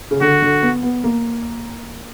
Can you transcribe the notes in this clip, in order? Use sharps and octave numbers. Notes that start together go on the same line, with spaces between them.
C#3
D3 F#4
D3
B3
B3
A#3